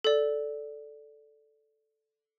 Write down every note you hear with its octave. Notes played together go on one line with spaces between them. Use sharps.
A4 D5